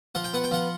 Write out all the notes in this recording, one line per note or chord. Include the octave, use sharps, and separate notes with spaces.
F3 F#5
G5
B3 F#5
G5
F3 F#5